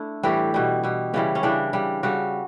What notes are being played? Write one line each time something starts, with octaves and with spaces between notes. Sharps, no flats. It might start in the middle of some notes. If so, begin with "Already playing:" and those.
Already playing: A3 D4 E4
A2 E3 G3 G4
B2 G3
B2 G3
C#3 E3 G3 C#4
C#4
C#3 E3 G3 D4
C#3 G3
C#3 G3 F#4